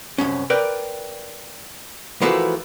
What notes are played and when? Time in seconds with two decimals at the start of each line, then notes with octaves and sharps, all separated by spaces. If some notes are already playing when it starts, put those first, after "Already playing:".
0.18 C2 F#2 C#4
0.50 A#4 B4 D5 G5
2.22 E3 F3 A3 A#3 F#4 B4